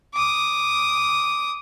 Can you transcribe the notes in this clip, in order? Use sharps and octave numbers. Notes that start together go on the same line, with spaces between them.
D6 D#6